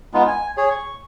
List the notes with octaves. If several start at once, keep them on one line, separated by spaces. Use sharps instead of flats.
G#3 B3 D#4 F4
G#5
G#4 C#5
C#6